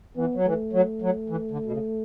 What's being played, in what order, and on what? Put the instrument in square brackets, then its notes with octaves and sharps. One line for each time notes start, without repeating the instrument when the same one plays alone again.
[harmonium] E3 [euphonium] B3
[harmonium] F#3
[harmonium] E3 [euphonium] A3
[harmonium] F#3
F#3
E3
D3
B2
C#3